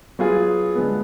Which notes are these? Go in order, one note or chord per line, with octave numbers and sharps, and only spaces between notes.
F#3 B3 F4 G#4
D3 G#3 B3